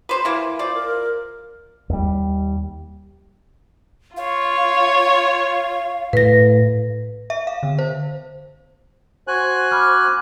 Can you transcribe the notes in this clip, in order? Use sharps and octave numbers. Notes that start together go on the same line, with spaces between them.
B4 C5
E3 A#3
F4 C5 D5
A#4
D#2 G3
F4 C#5 F5
A2 B4 A#6
E5
F5
D3
C5
F#4 C5 G#5 F#6
B5 D6 F6